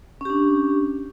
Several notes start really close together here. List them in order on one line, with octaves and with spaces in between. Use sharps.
C#4 G4 D4